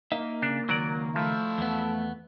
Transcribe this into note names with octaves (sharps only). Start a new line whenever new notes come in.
A#3 D#4 E5
C#3 D4
C#2 D#3 F#3 A#4 D5
F3 A3 E4 E5 F5
E2 B3